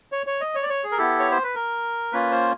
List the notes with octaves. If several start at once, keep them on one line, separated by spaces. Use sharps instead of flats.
C#5
C#5
D#5
C#5
D5
C#5
G#4
A#4
B3 E4 G4 A4
C#5
C5
B4
A#4
A#3 C#4 F4 B4
C5